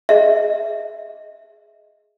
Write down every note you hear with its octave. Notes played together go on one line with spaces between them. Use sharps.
G#4 D#5 E5